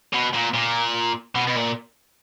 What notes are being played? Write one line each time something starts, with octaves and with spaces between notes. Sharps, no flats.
B2
A#2
A#2
B2
B2
A#2